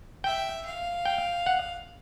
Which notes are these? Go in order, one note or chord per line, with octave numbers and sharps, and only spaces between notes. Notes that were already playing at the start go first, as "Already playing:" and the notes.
E5 G5
F5
G5
F#5